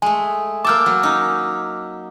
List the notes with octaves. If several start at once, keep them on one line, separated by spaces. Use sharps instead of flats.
G#3 A3 G#5
A#3 G5 A5 D6 E6 F6
F#3
C#4 D#4